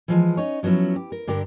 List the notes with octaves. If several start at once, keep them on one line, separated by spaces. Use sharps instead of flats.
E3 F3 G#3
C#4 D#4 C#5
F3 F#3 B3 C#4 E4
G4
A#4
G2 D3 G4 A#4